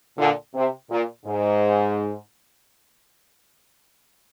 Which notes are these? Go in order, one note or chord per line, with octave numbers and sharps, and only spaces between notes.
A#2 D3
C3
A#2
G#2